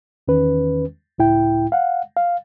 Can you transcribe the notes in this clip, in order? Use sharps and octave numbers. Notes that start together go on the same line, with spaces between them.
E2 D#3 C#4 B4
C#2 A2 E4 G5
F5 F#5
F5